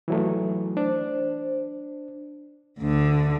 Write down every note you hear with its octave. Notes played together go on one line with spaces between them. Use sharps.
E3 F#3 A3
D4 C5
D2 D3